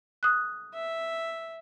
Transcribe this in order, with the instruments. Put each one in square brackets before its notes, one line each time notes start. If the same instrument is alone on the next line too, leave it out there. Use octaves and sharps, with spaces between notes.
[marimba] D#6 F#6
[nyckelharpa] E5